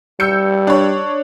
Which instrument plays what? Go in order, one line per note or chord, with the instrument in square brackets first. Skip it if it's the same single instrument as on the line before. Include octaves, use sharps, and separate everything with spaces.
[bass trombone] G3 [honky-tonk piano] E6 G6 C#7
[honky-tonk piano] D4 C#5